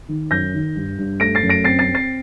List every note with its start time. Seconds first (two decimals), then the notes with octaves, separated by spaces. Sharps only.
0.09 D#3
0.31 F#2 G6 A#6
0.54 D#3
0.75 G2
0.98 G2
1.20 A3 A#6 D7
1.35 A6 C7
1.43 F#2
1.49 A#6 D7
1.64 C4 A6 C7
1.79 A6 C7
1.87 C4
1.95 A6 C7